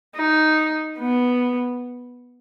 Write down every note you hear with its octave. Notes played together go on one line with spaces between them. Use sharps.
D#4
B3